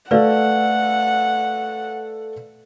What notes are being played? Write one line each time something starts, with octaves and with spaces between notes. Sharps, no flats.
A3 A4 B4 D5 F5 F#5